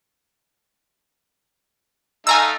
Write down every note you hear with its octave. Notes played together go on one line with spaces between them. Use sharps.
A3 D#4 F5 G#5 A#5 E6